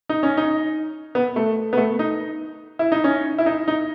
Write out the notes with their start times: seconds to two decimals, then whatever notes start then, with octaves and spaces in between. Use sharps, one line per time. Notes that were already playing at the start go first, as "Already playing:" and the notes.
0.09 D#4
0.23 C#4
0.37 D#4
1.15 B3
1.36 A3
1.73 B3
1.77 A3
1.99 D#4
2.79 E4
2.92 D#4
3.04 C#4
3.38 E4
3.46 D#4
3.68 D#4